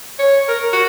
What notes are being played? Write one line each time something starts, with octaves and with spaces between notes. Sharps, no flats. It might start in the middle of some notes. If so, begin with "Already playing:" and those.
C#5
A#4
F#4